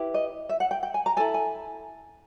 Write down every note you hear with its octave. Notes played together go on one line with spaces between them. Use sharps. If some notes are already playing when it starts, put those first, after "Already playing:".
Already playing: E4 G4 B4
D#5
E5
F#5
G5
G5
G#5
A#5
E4 A4 G#5
G#5